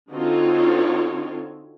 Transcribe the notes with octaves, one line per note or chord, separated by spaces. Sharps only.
D3 C4 D#4 F4 F#4 C#5